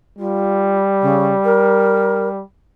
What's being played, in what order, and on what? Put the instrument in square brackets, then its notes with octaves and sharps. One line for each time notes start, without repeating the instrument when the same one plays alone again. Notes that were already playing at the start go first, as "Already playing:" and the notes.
[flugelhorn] G3 [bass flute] F4
[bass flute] C#3
A#4